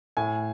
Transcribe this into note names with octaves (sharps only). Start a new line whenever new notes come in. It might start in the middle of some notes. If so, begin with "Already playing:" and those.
A2 G#5